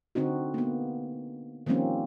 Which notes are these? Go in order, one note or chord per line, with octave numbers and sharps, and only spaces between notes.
D3 C4 D#4 F#4
A#3 B3
D#3 F3 G3 A#3 C4 C#4